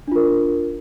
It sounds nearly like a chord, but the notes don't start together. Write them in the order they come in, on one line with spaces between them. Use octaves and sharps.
D4 F4 A#4